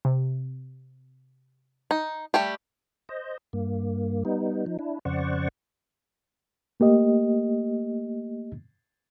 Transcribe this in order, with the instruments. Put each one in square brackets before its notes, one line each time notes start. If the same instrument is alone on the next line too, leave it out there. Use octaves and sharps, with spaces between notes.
[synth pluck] C3
[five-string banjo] D#4
G3 A3 G4
[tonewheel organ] C5 D#5
G2 A#3
G3 B3 D#4
F3 D#4
D4 E4
F2 C#3 C5 D5 F#5 C#6
[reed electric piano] A3 A#3 G4 D#5